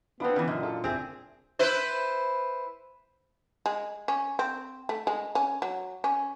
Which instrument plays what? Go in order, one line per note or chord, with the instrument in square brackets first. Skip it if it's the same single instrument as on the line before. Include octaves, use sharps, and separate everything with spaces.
[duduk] B3 [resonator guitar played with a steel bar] C4 D4 [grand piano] F4 B5
[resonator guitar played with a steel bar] C#3 E3
[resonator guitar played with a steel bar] F#2 [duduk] A#2 [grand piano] D#5 E5
[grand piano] D4 F4 A4
[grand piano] F#1 E5 [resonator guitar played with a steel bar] C4 G#4
[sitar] E4 B4 C5
[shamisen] G#3
C#4
C4
A3
G#3
C#4
F#3
C#4